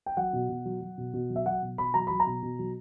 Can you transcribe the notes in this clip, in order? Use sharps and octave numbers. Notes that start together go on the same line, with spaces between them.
G5
F#3 F#5
B2
B2
F#3
F#3
B2
B2
F#3
E5
F#3 F#5
B2
B2 B5
F#3 A#5
F#3 B5
A#5
B2
B2
F#3